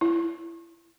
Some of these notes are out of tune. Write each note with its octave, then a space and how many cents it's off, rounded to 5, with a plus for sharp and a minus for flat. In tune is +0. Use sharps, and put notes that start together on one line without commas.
E4 +25